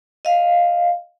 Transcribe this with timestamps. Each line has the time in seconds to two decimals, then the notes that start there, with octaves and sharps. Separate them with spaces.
0.25 D#5 F5